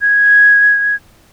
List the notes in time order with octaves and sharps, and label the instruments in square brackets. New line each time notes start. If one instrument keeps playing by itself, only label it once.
[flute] G#6